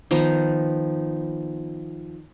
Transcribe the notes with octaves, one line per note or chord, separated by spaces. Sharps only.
D#3 F3 B3 A#5